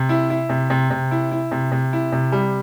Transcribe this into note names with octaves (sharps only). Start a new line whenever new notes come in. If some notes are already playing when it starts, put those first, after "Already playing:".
Already playing: C3
E4
E4
C3
C3
C3
E4
E4
C3
C3
E4
C3
G3